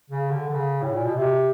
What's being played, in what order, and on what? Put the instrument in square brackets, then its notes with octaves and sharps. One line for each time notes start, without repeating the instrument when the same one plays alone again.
[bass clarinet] C#3
D3
D3
C#3
A2
A#2
B2
C3